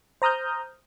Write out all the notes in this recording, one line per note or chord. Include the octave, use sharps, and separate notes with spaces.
C5 A#5 D#6 F6 G6